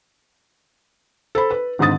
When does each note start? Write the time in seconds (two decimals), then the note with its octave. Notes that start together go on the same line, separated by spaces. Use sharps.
1.35 A4 C5 B5
1.51 B4
1.79 G#1 G#2 D3 D#6 A6